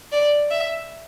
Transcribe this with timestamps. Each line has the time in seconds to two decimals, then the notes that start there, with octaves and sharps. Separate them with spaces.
0.12 D5
0.51 E5